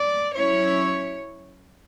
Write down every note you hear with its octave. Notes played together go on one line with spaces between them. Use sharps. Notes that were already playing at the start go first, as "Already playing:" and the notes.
Already playing: D5
F#3 C#4 E4 C#5